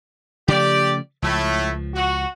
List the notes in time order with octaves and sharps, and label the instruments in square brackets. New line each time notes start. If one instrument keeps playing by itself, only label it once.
[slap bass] C#3 F3 A3 [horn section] G4 D5
[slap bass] C#2 F3 [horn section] A2 A3
[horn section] F#4